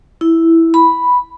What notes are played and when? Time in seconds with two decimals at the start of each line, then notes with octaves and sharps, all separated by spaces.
0.21 E4
0.74 B5